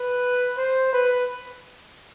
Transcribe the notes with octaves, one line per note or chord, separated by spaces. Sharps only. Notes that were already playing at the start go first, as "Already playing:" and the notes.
Already playing: B4
C5
B4